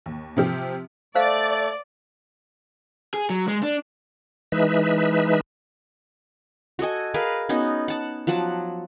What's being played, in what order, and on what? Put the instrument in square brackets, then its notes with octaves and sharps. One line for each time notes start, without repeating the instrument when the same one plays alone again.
[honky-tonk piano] D#2
C3 F3 G4
[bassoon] A3 [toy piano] C5 F5 [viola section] D5
[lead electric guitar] G#4
F#3
G#3
D4
[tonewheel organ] E3 G#3 D#4 B4 E5
[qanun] F#4 A4 D#5 G#5
G#4 A#4 B4 F5
B3 C#4 D#4 F#4
F#5 A5
F3 F#3 F#5 A5